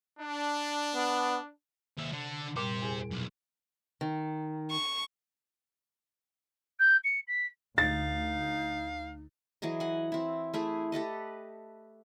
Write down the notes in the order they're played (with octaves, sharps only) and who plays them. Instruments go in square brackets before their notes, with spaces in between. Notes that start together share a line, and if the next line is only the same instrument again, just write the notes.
[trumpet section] D4
[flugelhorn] B3
[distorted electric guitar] D#2 E5 [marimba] C3
[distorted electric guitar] D3
[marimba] F#2 A#2 G3 [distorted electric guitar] G4 C5
[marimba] E2 G#4 G#5
[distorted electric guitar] B1
[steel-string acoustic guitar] D#3
[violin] C#6
[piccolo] G6
C#7
B6
[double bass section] D2 [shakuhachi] D#4 [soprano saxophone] F5 [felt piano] A6
[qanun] E3 F#3 G#4 D#5
F#5 G#5
C4 E4
A3 E4 G#4
G4 A4 B4 D#5